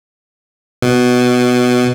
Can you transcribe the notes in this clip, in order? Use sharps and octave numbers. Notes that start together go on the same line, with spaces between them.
B2